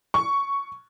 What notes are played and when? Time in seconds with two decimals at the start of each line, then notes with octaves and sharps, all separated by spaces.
0.14 C#6